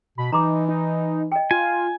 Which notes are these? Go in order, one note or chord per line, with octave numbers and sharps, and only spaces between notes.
B2 B5
E3 D#4 A#5 C6 D6
D#4
D#5 G5
F4 G#5